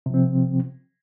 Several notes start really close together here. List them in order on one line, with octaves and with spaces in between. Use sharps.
C3 F3 C4